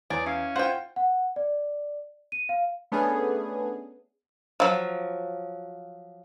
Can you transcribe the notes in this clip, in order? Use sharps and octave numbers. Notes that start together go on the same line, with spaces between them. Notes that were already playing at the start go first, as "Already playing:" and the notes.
E2 G#4 C#5 D5
C#4 E4 F5
F4 C5 F#5 G5
F#5
D5
D#7
F5
A3 B3 C#4 D4 G#4
F3 F#3